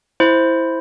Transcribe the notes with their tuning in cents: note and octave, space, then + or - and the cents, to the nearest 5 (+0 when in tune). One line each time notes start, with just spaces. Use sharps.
E4 +0 C5 +0